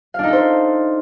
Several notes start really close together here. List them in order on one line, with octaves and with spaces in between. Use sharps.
F5 D4 D#4 A4 C5